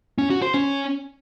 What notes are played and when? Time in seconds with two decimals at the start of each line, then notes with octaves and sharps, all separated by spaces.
0.18 C#4
0.30 F#4
0.42 C5
0.54 C#4